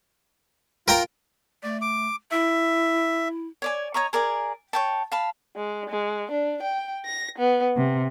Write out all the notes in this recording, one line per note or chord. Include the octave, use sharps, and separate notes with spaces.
F4 A#4 G5 A#5
A3 D5
D6
E4 E5
C#5 D5 G#5
C#5 D#5 A#5 C#6
G#4 A#4 D5 G#5
C#5 G5 A5
F5 A5 B5
G#3
G#3
D4
G5
A#6
B3
C3